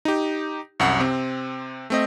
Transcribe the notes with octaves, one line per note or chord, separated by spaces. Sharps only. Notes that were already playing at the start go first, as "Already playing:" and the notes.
D#4 G4
C2 F#2 F#5
C3 C4
A3 C4 D#5